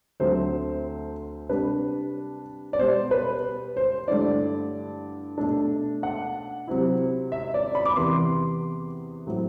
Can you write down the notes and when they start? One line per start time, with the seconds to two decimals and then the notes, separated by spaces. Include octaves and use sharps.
0.20 D2 D3 F#3 A3 C4 C5
1.49 C3 G3 D4 B4
2.73 D5
2.79 B2 G3 B3 C5
3.11 B4
3.77 C5
4.08 G2 D3 A3 E4 D5
5.38 B2 A3 D4
6.03 F#5
6.68 C3 F#3 C4 E4
7.32 E5
7.54 D5
7.75 B5
7.85 D6
7.96 E2 C3 E3 B3 C6
9.27 A2 F#3 C4 E4